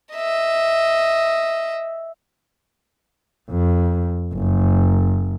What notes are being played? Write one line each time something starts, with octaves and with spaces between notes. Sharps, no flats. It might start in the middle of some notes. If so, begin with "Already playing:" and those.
D#5 E5
F2
F#1